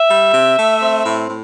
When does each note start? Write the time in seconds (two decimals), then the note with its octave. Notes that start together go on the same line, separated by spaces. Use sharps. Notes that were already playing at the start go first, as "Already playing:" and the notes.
Already playing: E5
0.09 G3
0.34 C3
0.57 A3
0.81 C4
1.05 A2
1.29 A2